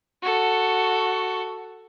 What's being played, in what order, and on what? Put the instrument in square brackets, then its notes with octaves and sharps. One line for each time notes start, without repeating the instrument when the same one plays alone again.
[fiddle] F#4 A4